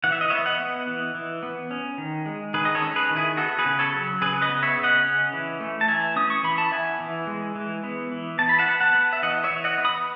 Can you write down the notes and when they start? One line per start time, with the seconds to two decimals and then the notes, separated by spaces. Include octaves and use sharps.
0.04 E3 F#5
0.12 E5
0.21 D#5
0.30 B3 C#5 E5
0.46 D#5 F#5
0.59 B3
0.87 E3
1.15 E3
1.43 B3
1.71 C#4
1.98 D#3
2.26 G#3
2.54 D#3 G#4 B4
2.65 D#5
2.75 A4 C#5
2.82 C#4
2.96 G#4 B4
3.10 D#3
3.16 E4 G#4
3.37 B3 F#4 A4
3.59 G#4 B4
3.65 C#3
3.79 A4 C#5
3.93 F#3
4.21 C#3 G#4 B4
4.42 B4 D#5
4.49 B3
4.62 C#5 E5
4.77 C#3
4.83 D#5 F#5
5.05 C#4
5.33 E3
5.60 A3
5.81 A5
5.88 E3 E5 G#5
6.16 C#4 D#6
6.30 C#6
6.43 E3 B5
6.58 A5
6.72 B3 E5 G#5
7.00 E3
7.27 G#3
7.55 E3
7.83 B3
8.12 E3
8.39 E3 A5
8.49 B5
8.59 F#5 A5
8.67 B3
8.81 F#5 A5
8.95 B3
9.13 E5
9.23 E3 D#5 F#5
9.44 C#5 E5
9.50 E3
9.64 D#5 F#5
9.78 B3
9.85 B5 D#6